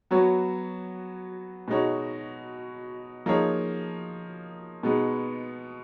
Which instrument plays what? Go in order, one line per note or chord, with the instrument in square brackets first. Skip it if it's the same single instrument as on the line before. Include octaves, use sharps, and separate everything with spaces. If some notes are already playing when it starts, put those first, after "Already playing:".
[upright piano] F#3 B3 F#4 C#5
B2 G#3 D#4 F#4 C#5
F3 A#3 D#4 G#4 C#5
B2 G#3 B3 D#4